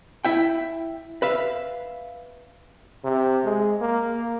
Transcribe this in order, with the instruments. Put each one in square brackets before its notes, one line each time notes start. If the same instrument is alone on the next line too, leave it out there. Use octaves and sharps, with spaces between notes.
[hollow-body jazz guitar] E4 E5 G5
B4 E5 F5
[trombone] C3
G#3
A#3